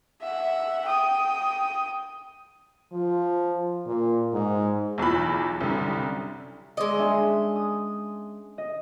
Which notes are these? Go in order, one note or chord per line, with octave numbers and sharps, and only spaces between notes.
E5 F#5
G5 D#6
F3
A#2
G#2
B1 E2 F4 B5
C2 F#2 D3 G3
G#3 D5 D#5 E6
C#4 D4 E5
D#6
D#5